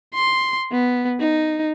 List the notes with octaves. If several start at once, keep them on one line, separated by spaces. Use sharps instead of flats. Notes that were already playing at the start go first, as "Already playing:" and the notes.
C6
B3
D#4